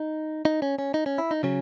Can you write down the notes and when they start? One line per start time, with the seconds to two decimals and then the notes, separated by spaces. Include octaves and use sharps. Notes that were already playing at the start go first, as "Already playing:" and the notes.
Already playing: D#4
0.45 D#4
0.62 C#4
0.79 C#4
0.94 D#4
1.06 C#4
1.18 E4
1.31 D#4
1.43 C#3 F#3 C#4